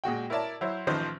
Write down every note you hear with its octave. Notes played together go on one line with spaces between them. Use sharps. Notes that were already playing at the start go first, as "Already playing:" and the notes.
A#2 G#3 F#4 G5
E4 A#4 C#5 D5 E5 A5
F#3 E4 C5
A1 D#3 F3 B4 C5